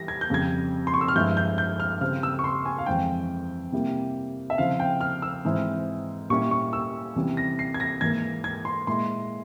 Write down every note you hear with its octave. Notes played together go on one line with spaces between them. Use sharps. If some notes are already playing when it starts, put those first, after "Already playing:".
Already playing: E3 G3 A#6
G#6
G6
F2 C#3 G3 G#6
C6
C#6
E6
F6
G2 F3 G#3 E4 G6
G6
G6
F6
C#3 G3 C4 F6
E6
C#6
C6
G#5
F5
F2 E3 G#3 C4 G5
C3 G3 A#3 E4
E5
C#3 F3 C4 E4 F5
G5
F6
E6
G#2 E3 G#3 C4 E4
A#2 G3 C#4 E4 C#6
C#6
E6
C3 E3 G3 C#4
A#6
C7
G#6
A#6
G#2 E3 A#3 G#6
G#6
C6
A#2 G#3 E4 C6